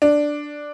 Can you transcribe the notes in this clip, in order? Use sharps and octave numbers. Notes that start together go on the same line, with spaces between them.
D4